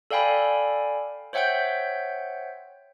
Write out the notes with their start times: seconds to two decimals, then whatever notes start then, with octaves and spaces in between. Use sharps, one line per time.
0.11 A4 D5 F5 G5 G#5 B5
1.33 C5 C#5 E5 F#5 G5 G6